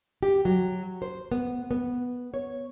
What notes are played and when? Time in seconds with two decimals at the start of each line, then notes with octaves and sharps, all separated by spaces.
0.23 G4
0.45 F#3
1.02 C5
1.32 B3
1.71 B3
2.34 C#5